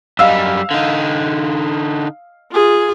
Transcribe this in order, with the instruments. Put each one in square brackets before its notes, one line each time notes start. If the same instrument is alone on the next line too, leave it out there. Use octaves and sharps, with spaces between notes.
[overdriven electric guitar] F#2 G3 [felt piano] D#5 F5 E6
[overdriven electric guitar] D3 D#4
[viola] F4 G#4